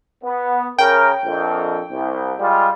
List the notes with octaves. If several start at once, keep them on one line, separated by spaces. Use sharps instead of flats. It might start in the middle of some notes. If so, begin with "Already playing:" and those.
B3
C#3 A#4 G5
A#1 F2
C2
G3 G#3 F4